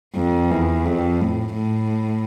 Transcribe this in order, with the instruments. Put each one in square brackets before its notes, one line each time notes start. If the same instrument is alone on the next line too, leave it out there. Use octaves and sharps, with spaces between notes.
[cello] F2
E2
F2
A2
A2